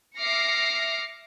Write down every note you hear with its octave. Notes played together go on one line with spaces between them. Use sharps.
E5 D6 F6 A#6 C7 C#7